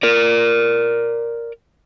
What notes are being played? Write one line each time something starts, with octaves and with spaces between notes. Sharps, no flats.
A#4 D5